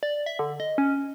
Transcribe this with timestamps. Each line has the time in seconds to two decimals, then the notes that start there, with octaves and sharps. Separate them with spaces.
0.03 D5
0.26 E5
0.39 D3
0.60 D#5
0.78 C#4